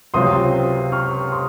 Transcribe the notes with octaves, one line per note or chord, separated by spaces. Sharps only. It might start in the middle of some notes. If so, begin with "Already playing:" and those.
C#2 C3 F#3 C4 F4 C6 D#6
C#6 F6
C6 D#6